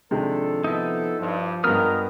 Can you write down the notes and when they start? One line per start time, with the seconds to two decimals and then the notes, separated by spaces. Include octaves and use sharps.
0.11 C3 D#3 F3 G#3 D4 A4
0.64 F3 B3 D#4 E4 A4
1.19 G2 F3
1.64 G2 G#3 B3 F4 A#4 D#6 F6